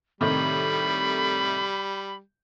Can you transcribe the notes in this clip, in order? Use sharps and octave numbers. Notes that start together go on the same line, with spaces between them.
A2 C3 D#3 G3 B5